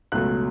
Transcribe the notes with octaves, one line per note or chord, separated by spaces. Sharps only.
C#2 B2 F#3 A3 F#6